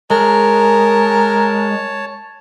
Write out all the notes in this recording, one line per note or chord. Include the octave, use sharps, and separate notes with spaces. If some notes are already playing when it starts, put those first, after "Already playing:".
G#3 A#4 C#5 A5